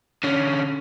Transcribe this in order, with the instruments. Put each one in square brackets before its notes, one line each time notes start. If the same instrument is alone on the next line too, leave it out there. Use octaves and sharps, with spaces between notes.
[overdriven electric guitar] D3 C#4